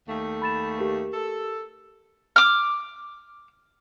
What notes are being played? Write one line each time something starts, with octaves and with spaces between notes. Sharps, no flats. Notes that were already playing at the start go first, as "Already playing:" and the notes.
D#2 A3
B5 A6 E7
G4 A#4
A4
D6 F6